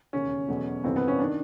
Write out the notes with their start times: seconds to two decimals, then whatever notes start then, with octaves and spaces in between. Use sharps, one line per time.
0.13 E1 D#2 C#3 C#4
0.48 E2 B2 F#3 A3
0.84 G1 F2 C3 E3 C4
0.96 B3
1.08 C#4
1.19 D#3 D4